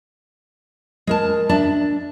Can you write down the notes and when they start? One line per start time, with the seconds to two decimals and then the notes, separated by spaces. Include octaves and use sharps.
1.07 G#3 A#4 A5
1.49 D4 D5 E5 A5